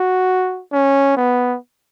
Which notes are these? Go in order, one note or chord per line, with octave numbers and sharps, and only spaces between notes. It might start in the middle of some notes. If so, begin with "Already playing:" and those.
Already playing: F#4
C#4
B3